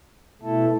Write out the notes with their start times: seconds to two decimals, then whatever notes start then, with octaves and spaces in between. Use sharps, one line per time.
0.41 B2 A3 E4 A4